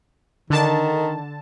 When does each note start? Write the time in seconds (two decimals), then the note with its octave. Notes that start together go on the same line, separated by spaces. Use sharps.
0.50 D3 D#3 A5